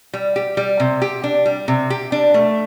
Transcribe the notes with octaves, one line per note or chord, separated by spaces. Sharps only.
G3
G4
G3
C3
G4
D4
G3
C3
G4
D4
A3